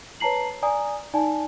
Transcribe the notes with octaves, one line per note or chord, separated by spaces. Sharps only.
B4 C#5 A5 A#5 C7 F#7
D5 G#5 A#5 D#6
D#4 D5 G#5 A5